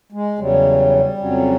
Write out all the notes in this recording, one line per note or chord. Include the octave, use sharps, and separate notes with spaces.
G#3
E2 C#3 F#3 G3
F2 C#3 F#3